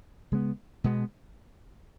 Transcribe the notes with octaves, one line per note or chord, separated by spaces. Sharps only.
C#3 G#3 B3
B2 G#3 B3